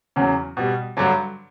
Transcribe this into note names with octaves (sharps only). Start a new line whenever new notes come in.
E2 C#3 F#3
B2 G3
G2 D3 F#3